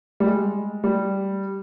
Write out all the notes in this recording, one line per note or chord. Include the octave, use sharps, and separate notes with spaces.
G3
G#3
G3